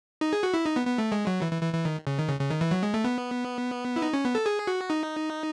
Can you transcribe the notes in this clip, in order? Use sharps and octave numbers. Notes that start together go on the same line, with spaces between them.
D#4
G#4
F#4
E4
D#4
B3
B3
A3
G#3
F#3
E3
E3
E3
E3
D#3
C#3
D#3
C#3
C#3
D#3
E3
F#3
G#3
A3
B3
E4
D#4
C#4
B3
A4
G#4
F#4
D#4